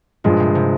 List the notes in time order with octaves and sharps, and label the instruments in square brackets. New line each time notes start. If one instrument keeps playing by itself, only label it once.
[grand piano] G2 F3 G#3 [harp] A#2
[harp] C3
C3